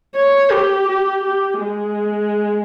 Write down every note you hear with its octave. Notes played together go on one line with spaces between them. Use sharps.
C#5
G4
G4
G4
G#3